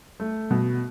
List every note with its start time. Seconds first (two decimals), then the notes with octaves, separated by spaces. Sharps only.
0.20 A3
0.51 B2